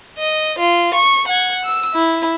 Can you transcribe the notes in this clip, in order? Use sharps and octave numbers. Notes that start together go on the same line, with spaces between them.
D#5
F4
C#6
F#5 G#6
E6
E4